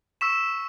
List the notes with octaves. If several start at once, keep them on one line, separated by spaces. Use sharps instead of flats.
C#6 E6 B6 E7